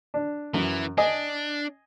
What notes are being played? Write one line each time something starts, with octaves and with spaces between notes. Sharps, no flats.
D4
F#2 E3
D4 D#5 G#5